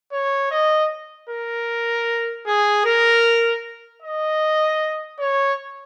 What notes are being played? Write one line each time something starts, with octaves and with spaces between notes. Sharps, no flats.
C#5
D#5
A#4
G#4
A#4
D#5
C#5